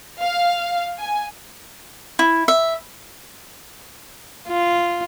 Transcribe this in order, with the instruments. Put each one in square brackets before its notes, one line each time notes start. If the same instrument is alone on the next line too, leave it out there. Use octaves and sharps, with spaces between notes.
[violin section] F5
G#5
[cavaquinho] E4
E5
[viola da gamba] F4